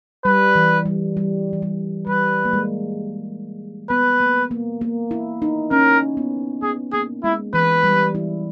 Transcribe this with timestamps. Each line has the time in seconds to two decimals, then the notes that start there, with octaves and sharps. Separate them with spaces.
0.25 G3 B4
0.56 E3
0.86 G3
1.17 G3
1.53 E3
1.62 G3
2.07 G3 B4
2.45 A#3
2.53 G#3
3.90 B3 B4
4.20 A#3
4.51 A#3
4.81 A#3
5.11 E4
5.42 D#4
5.71 C#4 A#4
6.17 B3
6.62 B3 G#4
6.93 A#3 G#4
7.24 G#3 E4
7.54 E3 B4
7.84 G3
8.15 E4